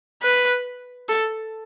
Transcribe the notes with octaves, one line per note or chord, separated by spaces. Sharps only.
B4
A4